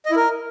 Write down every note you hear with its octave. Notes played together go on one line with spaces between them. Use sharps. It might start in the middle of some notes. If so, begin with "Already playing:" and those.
D#5
E4
A#4